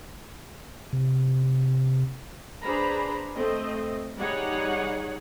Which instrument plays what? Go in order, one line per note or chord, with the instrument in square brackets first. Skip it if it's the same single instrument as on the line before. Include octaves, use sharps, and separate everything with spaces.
[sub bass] C3
[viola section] D4 G#4 B4 C5 A#5 B5
A3 C4 D#5
G3 D#4 G#4 C#5 F#5